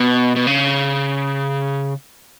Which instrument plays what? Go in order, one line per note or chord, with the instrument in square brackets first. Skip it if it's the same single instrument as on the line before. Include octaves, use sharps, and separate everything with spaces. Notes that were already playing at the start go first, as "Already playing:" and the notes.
Already playing: [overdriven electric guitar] B2
B2
C#3